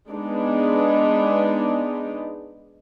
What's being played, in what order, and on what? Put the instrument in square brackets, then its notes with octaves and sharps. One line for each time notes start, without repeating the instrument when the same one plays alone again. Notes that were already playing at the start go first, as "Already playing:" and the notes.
[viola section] G#3 B3 D4 D#4